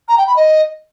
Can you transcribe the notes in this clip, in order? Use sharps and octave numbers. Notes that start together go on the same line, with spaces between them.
A#5
G5
B5
D#5